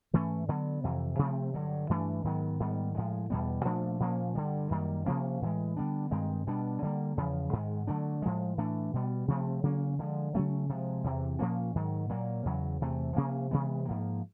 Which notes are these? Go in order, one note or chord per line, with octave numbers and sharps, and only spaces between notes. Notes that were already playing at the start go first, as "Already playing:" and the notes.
G#2 E3 A3 C#4
D3 F#3 B3
F2 C3 E3
C3 F3 A3 C4
G2 D3 F#3
G2 E3 A3 D4
G#2 D#3 F#3 B3
G#2 D#3 G3 B3
A2 F3 G#3
E2 B2 G3 B3
A#2 F3 A3 D4
A#2 F3 A#3 C#4
G2 D3 G3
F#2 D#3 G3 A#3
C3 F3 A#3 C#4
A2 E3 G#3
D3 G3 B3 D4
G2 D#3 G#3 C4
B2 G3 B3 D4
D3 G3 A#3
E2 C#3 F3
G#2 D#3 G#3
D3 F#3 A3 D4
A2 F3 G#3
A2 E3 A3 D4
B2 G3 B3
C3 F3 A3 C4
C#3 F#3 A#3 C#4
D3 F3 G#3
C#3 F#3 A3 C#4
C3 F3 G#3
E2 C3 E3
A#2 F3 A#3 C#4
G#2 D#3 F#3
A#2 F#3 A#3
E2 C#3 F#3
E2 C3 E3 A3
C3 F3 A#3 C#4
C3 E3 G#3 B3
G#2 F3 A#3